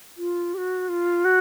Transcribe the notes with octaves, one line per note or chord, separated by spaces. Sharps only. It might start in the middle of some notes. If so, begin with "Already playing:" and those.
F4
G4
F#4
F4
F#4